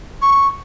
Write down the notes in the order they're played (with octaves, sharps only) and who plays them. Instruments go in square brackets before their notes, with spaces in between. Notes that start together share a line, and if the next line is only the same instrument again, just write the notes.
[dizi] C#6